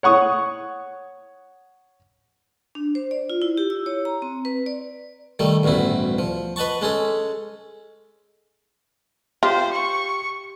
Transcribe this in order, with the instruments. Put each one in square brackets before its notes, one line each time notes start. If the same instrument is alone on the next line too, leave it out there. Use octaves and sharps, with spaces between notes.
[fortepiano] C#5 F#5 C#6 D#6
[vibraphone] D4
C5
D5
F4
E4
G4
E6
C#5
A#5
C4
B4
D5
[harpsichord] D#3 G3 A3
A1 D2 G2 B2 E4
F3
B4 D#5 F#5 A5 C#6
G#3 C#4 G#4 A4
[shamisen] F4 [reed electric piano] G4 [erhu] C5
[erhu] C#6